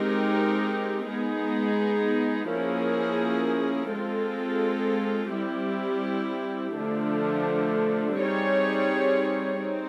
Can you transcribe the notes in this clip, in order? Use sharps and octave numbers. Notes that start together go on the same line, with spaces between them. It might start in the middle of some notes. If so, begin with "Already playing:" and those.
Already playing: G#3 C4 D#4 G4 A#4
G#3 B3 D#4 G#4
F3 A#3 C#4 E4 G#4
G#3 C4 F4 A4
G3 C4 E4 G4
D3 F3 A3 D4
G3 C4 D#4 G#4 C#5
C4 D#4